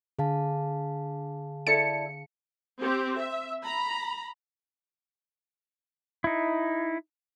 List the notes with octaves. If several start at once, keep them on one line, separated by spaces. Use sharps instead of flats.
D3 G#4 F5 A5
E4 A4 D5 C#7
C4 G4
E5
A#5 B5
D#4 E4